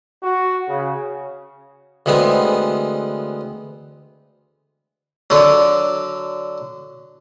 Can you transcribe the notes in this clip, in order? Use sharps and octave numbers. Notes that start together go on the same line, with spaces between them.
F#4
C#3
D2 E3 G#3 B3 C4
D3 F#3